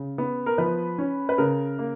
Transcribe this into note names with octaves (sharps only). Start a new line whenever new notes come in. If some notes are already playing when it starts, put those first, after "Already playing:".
Already playing: C#3
B3
A#4
F3 B4
C#4
B4
C#3 A#4
A#3